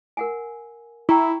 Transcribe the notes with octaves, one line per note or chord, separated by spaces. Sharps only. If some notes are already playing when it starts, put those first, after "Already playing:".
A#4 F#5 G#5
E4 G5 A#5 C#6